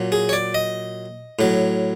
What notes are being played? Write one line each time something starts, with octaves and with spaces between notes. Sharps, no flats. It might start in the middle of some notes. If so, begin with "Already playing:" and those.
Already playing: A#2 F#3
G#4
C#5
D5
D#5
A2 F#3